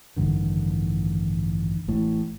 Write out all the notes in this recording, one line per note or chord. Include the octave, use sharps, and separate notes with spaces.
A1 G2 D3 D#3
A1 A2